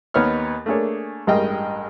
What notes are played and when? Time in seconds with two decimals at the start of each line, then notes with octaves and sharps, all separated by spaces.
0.14 D#2 B3 D#4 C#5 F6
0.66 A3 A#3 D4 G#4 C#5
1.27 A1 G2 G#3 A#4 D#5 G5